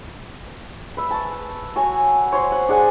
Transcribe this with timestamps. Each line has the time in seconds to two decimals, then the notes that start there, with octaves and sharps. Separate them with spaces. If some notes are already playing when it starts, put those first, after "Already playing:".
0.97 B4 E5
1.10 A5 C#6
1.75 F#4 C#5 G#5
2.32 C5 C#5
2.52 F#5
2.68 D4 G#4 F#5 G#5